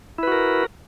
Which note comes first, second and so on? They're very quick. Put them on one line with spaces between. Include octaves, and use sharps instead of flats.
E4 B4 F#4 A#4